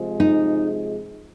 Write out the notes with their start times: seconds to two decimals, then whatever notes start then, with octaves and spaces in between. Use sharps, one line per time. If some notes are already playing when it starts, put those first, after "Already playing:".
Already playing: C3 F3 G#3
0.20 D#4